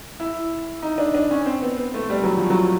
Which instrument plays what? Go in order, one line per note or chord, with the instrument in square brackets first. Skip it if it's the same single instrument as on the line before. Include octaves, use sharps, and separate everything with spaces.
[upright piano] E4
D#4
D4
D4
C#4
C4
B3
B3
A3
G3
F#3
F3
F#3